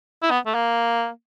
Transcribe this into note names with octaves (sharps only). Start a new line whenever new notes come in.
E4
B3
A3
A#3